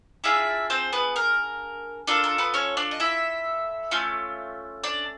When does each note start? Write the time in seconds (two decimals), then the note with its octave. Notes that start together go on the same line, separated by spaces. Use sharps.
0.24 D4 E4 F4 G#4 E5
0.70 C4 C5
0.93 B3 B4
1.16 A#4
2.07 D4 F4 A4 A#4
2.24 A#4
2.38 B3 B4
2.54 C#4 C#5
2.77 D4 D5
2.91 D#5
3.00 E4 E5
3.91 A3 C#4 F4
4.84 D4 D5